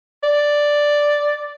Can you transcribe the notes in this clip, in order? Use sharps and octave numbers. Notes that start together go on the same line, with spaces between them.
D5